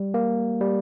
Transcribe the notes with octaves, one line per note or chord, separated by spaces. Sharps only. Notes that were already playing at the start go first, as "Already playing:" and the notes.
Already playing: G3
A#3
G3